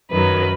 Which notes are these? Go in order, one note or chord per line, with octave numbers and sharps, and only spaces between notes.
F#2 D#3 F#3 B4